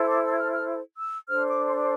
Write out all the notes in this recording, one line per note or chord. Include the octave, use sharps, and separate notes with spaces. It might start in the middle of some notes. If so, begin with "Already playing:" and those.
Already playing: E4 A4 C5
D6
E6
G#6
F6
F6
E6
D4 A4 C5 F6
D6
C6